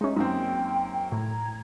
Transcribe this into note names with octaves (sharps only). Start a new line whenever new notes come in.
G#3 C#4 D#4 E5
F#2 A#3 C4 D#4 G5
A2 A#5 G#6